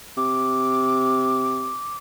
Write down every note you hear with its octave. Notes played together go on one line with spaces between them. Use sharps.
C3 D6